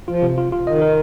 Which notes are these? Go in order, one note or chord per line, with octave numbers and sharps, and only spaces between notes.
F3 F4
C3
F4
F4
D#3 D#5
A#4